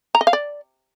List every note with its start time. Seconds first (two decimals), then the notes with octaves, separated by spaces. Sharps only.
0.15 A#5
0.21 D#5
0.27 F5
0.33 D5